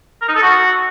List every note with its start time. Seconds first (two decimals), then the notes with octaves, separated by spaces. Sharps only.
0.22 A#4
0.28 D#4
0.35 A4
0.42 F#4